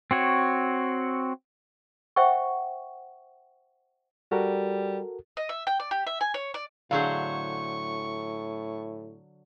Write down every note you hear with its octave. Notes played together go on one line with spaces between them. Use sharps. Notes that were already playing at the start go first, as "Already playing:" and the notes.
C4 F#4 C#5
C5 E5 F#5 G5 C#6
G3 F#4 A4 A#4
D#5
E5
G5
D5
G4
E5
G#5
C#5
D5
A2 D3 F#3 G#4 A4 C5 F5 C#6